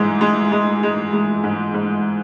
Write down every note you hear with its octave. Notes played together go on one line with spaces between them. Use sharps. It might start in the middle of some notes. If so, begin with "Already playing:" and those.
Already playing: G#2 E3 G#3
G#3
G#3
G#3
G#3
G#2
G#2